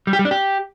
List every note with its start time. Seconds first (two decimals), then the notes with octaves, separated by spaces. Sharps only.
0.07 G3
0.13 G4
0.19 G3
0.25 D4
0.31 G4